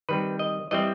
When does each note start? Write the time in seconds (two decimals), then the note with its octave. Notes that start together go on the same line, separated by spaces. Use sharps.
0.09 D#3 G3 C4 B4
0.39 D#5
0.71 E3 G3 C4 D#5